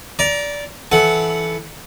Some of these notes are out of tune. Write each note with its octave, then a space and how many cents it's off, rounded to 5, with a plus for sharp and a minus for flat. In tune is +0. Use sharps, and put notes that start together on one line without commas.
D5 -15 A#5 +20
E3 +0 A4 -20 F#5 +0